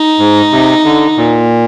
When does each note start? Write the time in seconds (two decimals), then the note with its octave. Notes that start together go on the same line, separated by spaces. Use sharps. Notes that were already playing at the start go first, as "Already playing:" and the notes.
Already playing: D#4
0.19 G#2
0.52 C3
0.84 D3
1.17 A#2